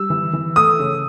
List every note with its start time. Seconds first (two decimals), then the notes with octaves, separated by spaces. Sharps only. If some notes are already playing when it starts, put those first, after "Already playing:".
Already playing: G3 E6
0.10 E3
0.33 E3
0.56 A3 D#6
0.79 C#3